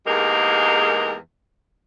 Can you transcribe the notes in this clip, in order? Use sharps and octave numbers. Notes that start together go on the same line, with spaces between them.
E2 G#2 G#3 A#3 G4 A#4